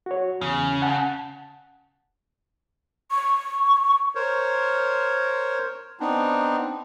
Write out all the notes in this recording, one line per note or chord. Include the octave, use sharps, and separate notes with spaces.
F#4 C#5
E2 C#3 F6
F#5 A5
C#6
A#4 C5 C#5
B3 C4 D4 D#4